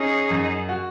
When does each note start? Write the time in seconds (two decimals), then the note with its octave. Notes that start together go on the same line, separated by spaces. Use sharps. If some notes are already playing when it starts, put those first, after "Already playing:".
Already playing: C#4 D#4 G#4
0.30 F#2
0.69 F#4